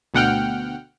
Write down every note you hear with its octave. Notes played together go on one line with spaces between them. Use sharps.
D2 B2 F#5 G5 F6